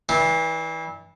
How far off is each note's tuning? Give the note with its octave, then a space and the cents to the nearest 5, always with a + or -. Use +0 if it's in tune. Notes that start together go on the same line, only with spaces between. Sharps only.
E3 -30 D4 +0